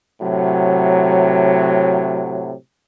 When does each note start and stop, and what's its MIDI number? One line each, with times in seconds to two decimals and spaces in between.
0.21 2.52 45
0.21 2.52 48
0.21 2.52 54